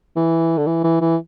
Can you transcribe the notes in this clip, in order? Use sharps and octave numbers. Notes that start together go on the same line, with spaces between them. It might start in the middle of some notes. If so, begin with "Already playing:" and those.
E3
D3
E3
E3
E3